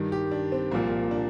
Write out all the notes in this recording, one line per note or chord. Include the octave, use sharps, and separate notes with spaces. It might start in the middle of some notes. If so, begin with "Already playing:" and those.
Already playing: G2 D#3
G4
D4
C4
C2 A#2 F3 A#3
D4